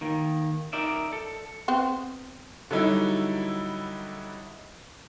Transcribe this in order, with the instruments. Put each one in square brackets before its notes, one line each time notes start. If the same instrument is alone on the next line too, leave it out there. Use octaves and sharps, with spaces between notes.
[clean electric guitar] D#3 A#3
D#4 A#4 D5 E5
A4
[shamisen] B3 C4 C5
[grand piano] D3 F#3 G3 D#4 E4